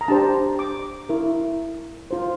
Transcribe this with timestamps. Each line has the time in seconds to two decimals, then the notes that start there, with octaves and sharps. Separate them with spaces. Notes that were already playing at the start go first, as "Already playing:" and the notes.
0.01 A#5
0.08 D4 G4 C5 A5
0.59 D6
1.09 E4 A#4
2.11 F4 C5